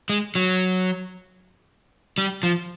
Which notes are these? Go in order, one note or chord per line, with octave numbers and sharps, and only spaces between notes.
G#3
F#3
G3
F3